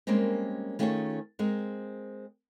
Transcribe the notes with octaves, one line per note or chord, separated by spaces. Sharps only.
G3 G#3 A#3 C4 C#4 A#4
D#3 A3 C#4 F4 G#4 C#5
G#3 C4 A#4